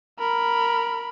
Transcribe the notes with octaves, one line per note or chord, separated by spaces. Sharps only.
A#4 B5